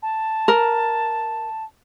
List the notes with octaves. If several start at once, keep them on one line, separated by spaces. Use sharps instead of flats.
A5
A#4